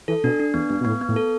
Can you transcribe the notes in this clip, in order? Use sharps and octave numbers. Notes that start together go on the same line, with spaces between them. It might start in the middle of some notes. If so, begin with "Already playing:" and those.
E3 A4
B2 D4
D4
E2 B3
G2 B3
B2
A2 B3
B3
A2
A4